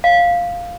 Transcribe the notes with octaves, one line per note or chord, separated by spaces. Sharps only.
F5